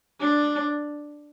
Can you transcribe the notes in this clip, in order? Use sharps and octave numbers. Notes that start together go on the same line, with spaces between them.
D4